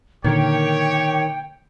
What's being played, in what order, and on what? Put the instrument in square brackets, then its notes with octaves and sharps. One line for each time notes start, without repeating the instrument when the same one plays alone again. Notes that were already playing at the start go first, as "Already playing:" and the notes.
[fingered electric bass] A#2 D3 [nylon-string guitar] D#3 A#4 [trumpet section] G4 C#5 [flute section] G5